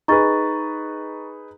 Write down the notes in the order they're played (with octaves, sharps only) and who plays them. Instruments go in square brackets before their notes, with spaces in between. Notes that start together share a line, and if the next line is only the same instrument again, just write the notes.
[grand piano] D#4 G#4 B4 [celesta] A#5 C#6 A6